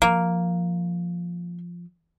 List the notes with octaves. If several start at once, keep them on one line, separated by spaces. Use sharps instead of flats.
F3 A#3